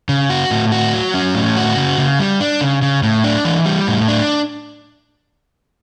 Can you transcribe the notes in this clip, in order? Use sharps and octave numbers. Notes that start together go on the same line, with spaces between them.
C#3
F#4
A2
F#4
F#3
C#4
A2
F#4
C#3
C#3
G3
D4
C#3
C#3
A2
D4
E3
G3
A2
D4